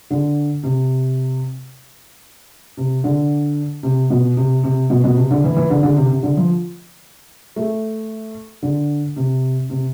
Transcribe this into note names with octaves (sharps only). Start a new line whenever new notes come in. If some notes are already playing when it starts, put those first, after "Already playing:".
D3
C3
C3
D3
C3
B2
C3
C3
B2
B2
C3
D3
E3
E3
D3
D3
C3
C3
D3
F3
A3
D3
C3
C3